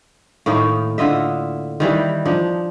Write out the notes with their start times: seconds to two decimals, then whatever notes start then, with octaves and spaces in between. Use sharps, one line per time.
0.46 A2 D#3 A#3 D#4
0.98 D3 F4 D#5 E5
1.80 D#3 E3 G3
2.26 F3 D4 D#4